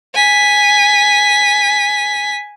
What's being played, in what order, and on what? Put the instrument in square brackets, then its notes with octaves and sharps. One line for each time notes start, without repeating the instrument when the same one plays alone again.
[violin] G#5 B6